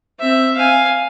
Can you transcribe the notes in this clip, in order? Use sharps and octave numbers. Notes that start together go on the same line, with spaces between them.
C4 E5
F5 G#5